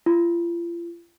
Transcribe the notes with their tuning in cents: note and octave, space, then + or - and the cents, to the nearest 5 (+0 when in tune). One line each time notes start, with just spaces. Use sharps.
F4 -40